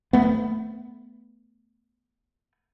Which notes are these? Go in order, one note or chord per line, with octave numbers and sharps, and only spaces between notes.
A3 B3